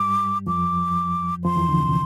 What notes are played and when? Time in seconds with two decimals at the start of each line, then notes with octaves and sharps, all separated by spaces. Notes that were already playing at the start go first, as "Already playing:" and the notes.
Already playing: G2 G3 D6
0.47 F2 F3 D6
1.44 F2 F3 C6
1.56 E2 E3
1.68 D2 D3
1.80 C3